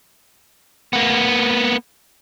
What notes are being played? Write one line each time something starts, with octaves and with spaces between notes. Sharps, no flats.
A#3 B3